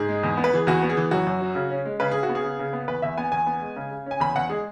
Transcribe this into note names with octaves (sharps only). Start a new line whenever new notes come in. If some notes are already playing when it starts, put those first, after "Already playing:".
Already playing: G#2 G#4
G#3
E2
B3
B4
E3 G#4
E2 F#4
B3
G#4
E3
F#2 F#4
F#2
F#3
C#3
C#4
G#3
C#3 B4
C#3 G#4
F#4
B3
G#4
C#3
C#3
B3
E2 B4
E2 E5
B3 G#5
E2 G#5
B3
G#3
C#3
C#3
C#4 G#5
E2 B5
E2 F#5
G#3 G#4